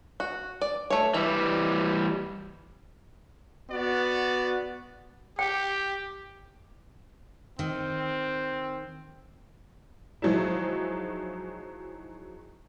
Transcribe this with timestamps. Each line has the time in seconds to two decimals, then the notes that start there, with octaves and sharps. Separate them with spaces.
0.20 F#4
0.62 D5
0.90 A3 C#5
1.14 E3 G3 E5
3.68 B3 F#4 D5
5.39 G4 G5
7.59 D#3 C4
10.22 D#3 F3 F#3 G#3 E4